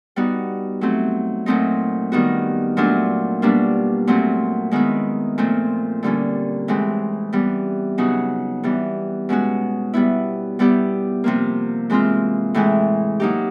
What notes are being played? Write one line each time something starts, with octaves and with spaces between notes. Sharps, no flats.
G3 B3 D#4 F#4
F#3 A3 C4
A#2 F#3 A3 C4 D#4
D#3 G3 B3 D#4 F#4
A#2 F#3 A3 D4 F4
B2 G3 A#3 D4
A#2 F#3 A3 C4
D#3 G#3 B3 E4
A#2 F3 A3 C4
D3 G3 A#3 C#4
A2 E3 G#3 C4
E3 G3 B3
C#3 F#3 B3 D#4 F#4
E3 G3 B3
B2 G#3 C#4 F#4
G3 B3 E4
G3 B3 E4 G4
C3 F3 A#3
E3 G#3 C4 F4
A2 E3 G#3
F#3 A#3 D#4 G4